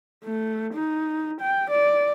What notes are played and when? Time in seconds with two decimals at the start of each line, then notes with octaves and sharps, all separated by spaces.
0.24 A3
0.74 D#4
1.41 G5
1.71 D5